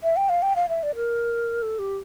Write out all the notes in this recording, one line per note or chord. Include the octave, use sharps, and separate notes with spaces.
E5
G5
F5
G5
F5
E5
D5
A#4
A4
G4